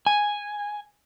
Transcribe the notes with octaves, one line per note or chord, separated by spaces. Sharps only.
G#5